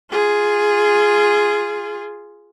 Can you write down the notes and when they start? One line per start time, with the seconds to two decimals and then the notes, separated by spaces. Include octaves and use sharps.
0.11 F4 G#4